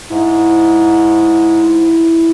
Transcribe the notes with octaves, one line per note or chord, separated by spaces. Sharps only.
G#2 E4